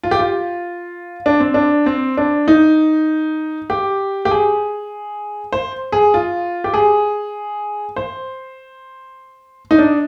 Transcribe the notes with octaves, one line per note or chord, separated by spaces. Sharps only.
F4
G4
F4
D4
C4
D4
C4
D4
D#4
G4
G4
G#4
C5
G#4
F4
G4
G#4
C5
D#4
D4